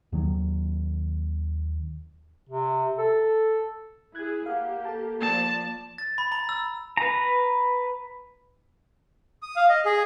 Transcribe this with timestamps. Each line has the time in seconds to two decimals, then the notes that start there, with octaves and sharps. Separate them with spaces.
0.12 D#2 D#3 F#3
2.49 C3
2.98 A4
4.15 E4 G#4 F#6 G#6
4.46 A#3 G4 F5 F#5
4.85 A4 A5
5.22 F3 A#3 D5 A5
5.98 A6
6.18 B5
6.32 A#5
6.49 E6
6.97 B4 A#5
9.42 D#6
9.56 F5
9.69 D#5
9.85 G#4